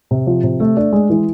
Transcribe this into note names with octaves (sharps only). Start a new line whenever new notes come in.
C3
F3
C3
A3
D4
G#3
E3